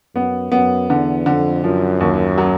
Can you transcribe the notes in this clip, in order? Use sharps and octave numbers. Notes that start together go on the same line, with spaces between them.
F#2 B3
F#2 B3
E2 D3
F2 D3
F#2 F3
D#2
F#3